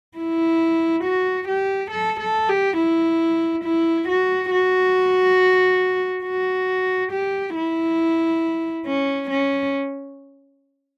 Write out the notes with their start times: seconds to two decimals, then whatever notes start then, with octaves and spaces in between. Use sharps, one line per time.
0.18 E4
1.04 F#4
1.48 G4
1.91 A4
2.20 A4
2.49 G4
2.77 E4
3.64 E4
4.09 F#4
4.51 F#4
6.25 F#4
7.12 G4
7.56 E4
8.86 C#4
9.30 C#4